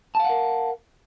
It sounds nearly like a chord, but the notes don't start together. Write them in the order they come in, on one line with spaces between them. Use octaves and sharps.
A5 F5 F#5 A#4